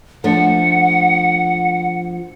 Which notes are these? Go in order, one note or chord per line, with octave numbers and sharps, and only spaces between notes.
F3 A3 D4 F#5